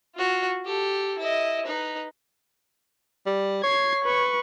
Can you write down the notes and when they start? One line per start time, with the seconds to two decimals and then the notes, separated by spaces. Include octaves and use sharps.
0.15 F4 F#4
0.65 G4 A4
1.19 E4 D#5
1.66 D#4 B4
3.26 G3
3.63 C#5 G#6 C7
4.04 B4 C#6